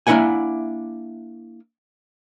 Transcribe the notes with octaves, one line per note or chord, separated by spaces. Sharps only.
A#3 D4 E4 E5 F#5 G#5